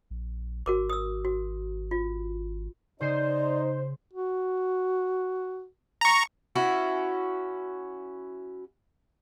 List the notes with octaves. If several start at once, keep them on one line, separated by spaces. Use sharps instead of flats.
A#1
G#1 F#4 A#4 D6
D#6 E6
F#4
F4
C#3 D#4 G#4 C5 D5
F#4
A#5 C#6
C#4 E4 F#4